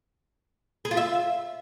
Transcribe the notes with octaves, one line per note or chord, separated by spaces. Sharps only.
G#4
F4
E5